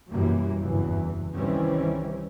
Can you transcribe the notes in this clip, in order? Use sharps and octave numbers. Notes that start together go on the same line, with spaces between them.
F#2 B2 E3 G3 A#3
F#1 E2 G2 A#2 E3
C2 D#3 E3 G3 C4 C#4